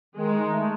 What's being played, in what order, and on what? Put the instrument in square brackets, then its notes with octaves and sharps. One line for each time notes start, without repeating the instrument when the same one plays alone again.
[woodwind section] D#3 [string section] G#3
[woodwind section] D#4
A3